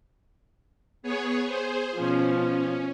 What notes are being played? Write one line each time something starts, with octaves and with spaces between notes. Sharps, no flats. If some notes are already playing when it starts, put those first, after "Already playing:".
B3 G#4 C#5
G#4 C5
B2 F3 C#4